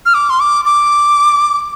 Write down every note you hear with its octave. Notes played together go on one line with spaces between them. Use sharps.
F6
D6
C6
D6
D6